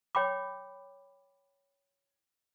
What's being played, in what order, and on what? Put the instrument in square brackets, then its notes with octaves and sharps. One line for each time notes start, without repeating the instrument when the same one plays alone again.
[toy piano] C#5 G5 B5 D6